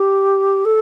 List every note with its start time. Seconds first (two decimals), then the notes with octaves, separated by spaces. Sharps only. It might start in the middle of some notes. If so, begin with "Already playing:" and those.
Already playing: G4
0.65 A4